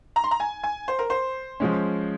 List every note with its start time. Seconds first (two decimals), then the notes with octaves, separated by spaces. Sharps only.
0.16 A#5
0.24 C6
0.31 A#5
0.40 G#5
0.63 G#5
0.88 C5
0.99 A#4
1.10 C5
1.60 F3 G#3 C#4